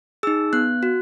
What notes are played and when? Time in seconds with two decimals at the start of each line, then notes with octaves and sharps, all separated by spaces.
0.23 D#4 G#4 E6
0.53 B3 F#6
0.83 F#4